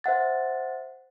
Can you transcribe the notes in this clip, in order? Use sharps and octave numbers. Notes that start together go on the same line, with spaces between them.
C5 E5 F#5 A6